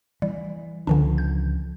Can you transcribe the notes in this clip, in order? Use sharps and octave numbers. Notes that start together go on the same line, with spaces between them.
E3 G3
C#2 D3 E3 F3 D4
G6